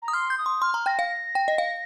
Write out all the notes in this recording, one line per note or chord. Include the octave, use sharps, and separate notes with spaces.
A#5
D#6
C6 F6
G6
D#6
C6
C6 F6
A#5
G5 A#6
F5
G5
D#5
F5